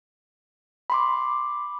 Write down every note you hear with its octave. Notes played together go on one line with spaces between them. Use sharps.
B5 C6 D6